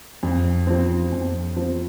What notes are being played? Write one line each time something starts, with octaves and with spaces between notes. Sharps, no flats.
F2
F3 C4
F2
F3 C4